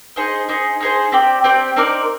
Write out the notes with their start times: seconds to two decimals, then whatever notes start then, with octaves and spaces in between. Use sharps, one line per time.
0.16 D#4 G#4 C5 D#5
0.49 D#4 G#4 C5
0.80 D#4 G#4 C5
1.12 C4 G4 D5 G5
1.44 C4 G4 D5 G5
1.76 C4 D#4 A#4 D5